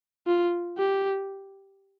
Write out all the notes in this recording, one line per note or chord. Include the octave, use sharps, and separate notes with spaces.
F4
G4